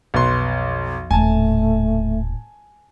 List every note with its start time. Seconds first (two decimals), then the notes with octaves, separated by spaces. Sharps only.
0.14 B1 F2 B4 C6
1.11 D#1 A2 A3 G#5 A5